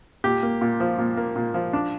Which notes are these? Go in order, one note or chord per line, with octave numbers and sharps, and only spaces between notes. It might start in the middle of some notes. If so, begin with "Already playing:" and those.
A#2 G4
A#3
A#2
F3
A#2
A#3
A#2
F3
D4